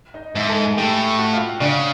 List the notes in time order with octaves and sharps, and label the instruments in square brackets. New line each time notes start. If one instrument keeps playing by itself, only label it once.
[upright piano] D#4 D#5
[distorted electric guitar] G#2 [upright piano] E4 E5
[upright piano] A4 A5
G#4 G#5
[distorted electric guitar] A2 [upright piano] G4 G5
[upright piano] F#4 F#5
F4 F5
[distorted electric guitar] C#3 [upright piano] D4 D5